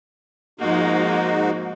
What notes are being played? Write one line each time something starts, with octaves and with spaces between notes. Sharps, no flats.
G#2 F3 G#3 A#3 D#4 F#4